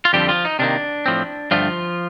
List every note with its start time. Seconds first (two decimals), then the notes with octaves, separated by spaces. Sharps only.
0.05 F4
0.13 F2 D3 F3 G3 C4 G4
0.29 F3 F4
0.45 D#4
0.59 C3 D#3 A#3 D4
1.06 A2 F3 C4
1.51 G2 D3 F3 A3 F4